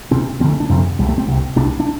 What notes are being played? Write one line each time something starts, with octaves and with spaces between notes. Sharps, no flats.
D2 C3 C4
D2 D3 C4
A3
D4
F2 C3 C4
C2 C3 G3
A3
C4
C2 C3
C2 C3 D4
D4